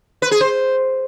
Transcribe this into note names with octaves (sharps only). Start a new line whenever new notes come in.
B4
G#4
C5